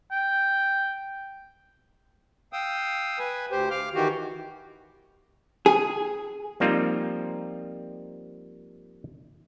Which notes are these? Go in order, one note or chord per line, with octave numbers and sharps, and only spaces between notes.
G5
F5 G5 D#6 E6
B4 G#5
D2 G4 C5
F5 D6 F6
D#3 E3 F#4 G4
G#4
F3 G3 A#3 C4 D#4 F4